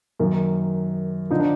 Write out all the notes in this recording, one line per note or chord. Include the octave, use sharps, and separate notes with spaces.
F#2 D#3 A#3
D3 F3 D#4
D4